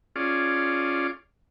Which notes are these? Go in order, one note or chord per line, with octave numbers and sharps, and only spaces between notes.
C#4 F4 G#4 D5